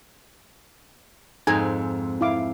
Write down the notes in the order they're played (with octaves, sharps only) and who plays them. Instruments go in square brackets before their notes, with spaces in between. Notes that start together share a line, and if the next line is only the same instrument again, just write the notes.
[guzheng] F2 G#2 C4 [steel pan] D#4 G#4 A#5 [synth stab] G#5
[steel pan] E4 F5 D6